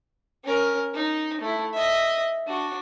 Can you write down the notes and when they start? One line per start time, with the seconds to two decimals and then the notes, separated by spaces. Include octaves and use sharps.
0.44 C#4 A#4
0.94 D#4
1.41 A3 E4
1.73 D#5 E5
2.47 D4 F#4